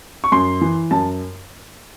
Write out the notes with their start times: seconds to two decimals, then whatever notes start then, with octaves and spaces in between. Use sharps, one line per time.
0.24 C#6
0.32 F#2 C6
0.61 E3
0.91 F#2 A5